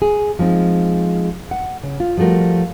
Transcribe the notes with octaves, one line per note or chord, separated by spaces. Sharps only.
G#4
F3 G#3 C4 D#4
F#5
C#3
F4
F3 G3 A3 F#4 A#4